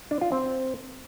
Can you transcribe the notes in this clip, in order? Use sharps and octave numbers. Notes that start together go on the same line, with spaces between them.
D4
F4
C4